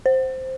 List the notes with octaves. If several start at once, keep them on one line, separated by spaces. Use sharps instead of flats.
C5